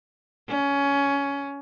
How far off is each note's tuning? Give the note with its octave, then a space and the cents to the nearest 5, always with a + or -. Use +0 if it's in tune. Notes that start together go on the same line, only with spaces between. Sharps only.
C#4 +15